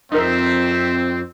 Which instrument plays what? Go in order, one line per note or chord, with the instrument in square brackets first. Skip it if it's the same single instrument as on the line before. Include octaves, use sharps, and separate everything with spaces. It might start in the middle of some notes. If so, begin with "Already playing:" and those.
[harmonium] F2 [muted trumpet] C4 [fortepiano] D#4 A#4 [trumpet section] C5 E5